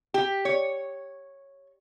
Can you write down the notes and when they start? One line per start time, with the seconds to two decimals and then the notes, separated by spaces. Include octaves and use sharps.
0.14 G4
0.45 C#5